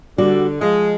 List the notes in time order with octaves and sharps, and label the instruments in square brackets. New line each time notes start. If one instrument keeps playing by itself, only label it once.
[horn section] D3 [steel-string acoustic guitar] G3 F#4 D5
[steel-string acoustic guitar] F3 [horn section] G#3